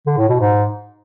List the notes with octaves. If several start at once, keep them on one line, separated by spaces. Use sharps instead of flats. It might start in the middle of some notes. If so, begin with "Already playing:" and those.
D3
A2
B2
G#2